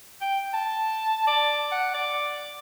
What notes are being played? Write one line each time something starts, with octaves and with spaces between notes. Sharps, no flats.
G5
A5
D5
F#5
D5